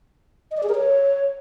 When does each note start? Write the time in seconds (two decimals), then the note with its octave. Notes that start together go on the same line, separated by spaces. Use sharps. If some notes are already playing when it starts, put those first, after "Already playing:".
0.51 D#5
0.57 D5
0.63 G#4
0.69 A#4
0.75 C#5